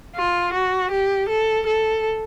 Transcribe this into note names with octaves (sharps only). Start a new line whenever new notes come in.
F4
F#4
G4
A4
A4